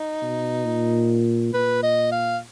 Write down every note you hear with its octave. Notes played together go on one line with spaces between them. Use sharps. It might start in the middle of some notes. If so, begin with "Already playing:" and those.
Already playing: D#4
B2
A#2
A#2 B4
D#5
F5